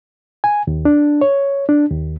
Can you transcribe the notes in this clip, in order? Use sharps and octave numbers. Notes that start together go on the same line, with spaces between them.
G#5
D#2
D4
C#5
D4
D#2